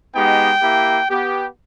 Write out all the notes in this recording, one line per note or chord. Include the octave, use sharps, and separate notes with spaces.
G#3 B3 D#4 G4 G5
A#3 E4 G4
B3 G4